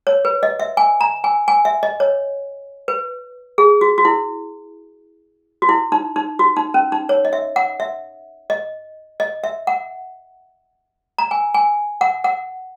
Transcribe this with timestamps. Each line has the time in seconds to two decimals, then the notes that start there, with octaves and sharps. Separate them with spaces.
0.07 C#5
0.25 B4
0.43 D#5
0.60 E5
0.77 G#5
1.01 A#5
1.24 G#5
1.48 G#5
1.65 E5
1.83 D#5
2.00 C#5
2.88 B4
3.58 G#4
3.81 F#4
3.98 F#4
4.05 E4
5.62 F#4
5.69 E4
5.92 D#4
6.16 D#4
6.39 F#4
6.56 D#4
6.74 C#4
6.92 D#4
7.09 C#5
7.25 D#5
7.33 E5
7.56 F#5
7.80 E5
8.50 D#5
9.20 D#5
9.44 E5
9.67 F#5
11.18 A#5
11.31 G#5
11.54 G#5
12.01 F#5
12.24 F#5